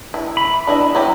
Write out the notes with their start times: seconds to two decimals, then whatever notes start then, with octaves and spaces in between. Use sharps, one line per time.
0.14 E4
0.37 B5
0.67 D4 E4 D#5
0.95 F#3 E4 G4